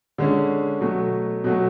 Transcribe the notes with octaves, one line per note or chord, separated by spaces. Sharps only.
D3 G#3 C#4
B2 F#3 A3
B2 F#3 A3